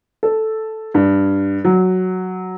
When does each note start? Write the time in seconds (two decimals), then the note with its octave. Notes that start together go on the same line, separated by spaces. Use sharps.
0.23 A4
0.94 G2
1.65 F#3